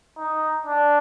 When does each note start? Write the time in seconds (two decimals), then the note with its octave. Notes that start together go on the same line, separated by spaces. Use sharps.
0.18 D#4
0.65 D4